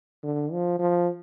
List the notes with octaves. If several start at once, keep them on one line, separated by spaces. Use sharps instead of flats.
D3
F3
F3